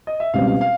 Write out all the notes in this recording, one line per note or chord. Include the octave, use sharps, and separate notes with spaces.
D#5
E5
C#2 B2 G3 C4 F5
F5
F5